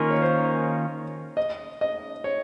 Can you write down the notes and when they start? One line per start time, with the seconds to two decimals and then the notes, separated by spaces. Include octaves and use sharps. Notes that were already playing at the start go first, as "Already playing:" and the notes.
Already playing: D#3 A#3 C#4 F4 A#4
0.11 C#5
0.22 C5
1.37 D#5
1.81 D#5
2.24 C#5